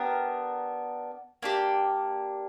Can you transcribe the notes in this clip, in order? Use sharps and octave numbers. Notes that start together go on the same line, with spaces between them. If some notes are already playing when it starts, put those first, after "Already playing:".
Already playing: B3 D4 G4 A#4
A#3 D4 G4